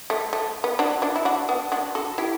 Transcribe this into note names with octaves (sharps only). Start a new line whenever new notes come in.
A3
A3
B3
D4 F#4
D4 F#4
E4
D4 F#4
B3 D4
D4 F#4
F#4 A4
E4 G4